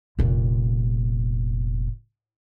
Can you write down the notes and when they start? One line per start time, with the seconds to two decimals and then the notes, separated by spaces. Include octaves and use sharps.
0.19 F1 A#2